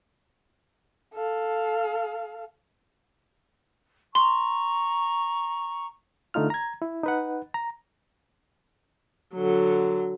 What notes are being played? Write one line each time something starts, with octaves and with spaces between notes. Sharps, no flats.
A4 F5
A#5 C6 C#6
D3 A3 D#4 F4 F6
A#5 G#6
E4
D#4 B4 F#5
A#5
D3 F#3